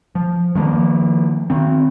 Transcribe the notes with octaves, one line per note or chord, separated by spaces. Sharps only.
F3
D#3 F3 A3 A#3
D#3 C4